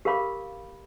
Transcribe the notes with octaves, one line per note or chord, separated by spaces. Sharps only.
G4 A#4 B4 F5 B5 D6